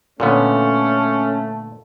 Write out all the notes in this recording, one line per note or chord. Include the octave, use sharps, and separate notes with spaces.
A#2 D3 A3 B3 C#4